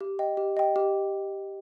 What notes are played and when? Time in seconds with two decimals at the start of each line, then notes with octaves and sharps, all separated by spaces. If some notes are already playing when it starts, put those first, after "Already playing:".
0.01 G4
0.19 D#5 G5
0.37 G4
0.57 D#5 G5
0.76 G4